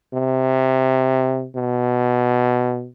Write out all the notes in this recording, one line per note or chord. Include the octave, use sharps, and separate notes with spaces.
C3
B2